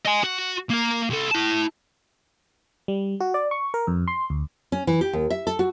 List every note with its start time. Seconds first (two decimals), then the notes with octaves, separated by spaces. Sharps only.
0.05 D#5 G#5
0.23 F#4
0.70 A#3 A#5
1.10 C2 A4
1.31 E4 A5
2.88 G3
3.20 F#4
3.34 D5
3.51 C#6
3.74 A#4
3.87 F2
4.08 C6
4.30 D2
4.72 C#4
4.87 E3
5.01 G4
5.13 D#2
5.30 E5
5.47 A4
5.59 F#4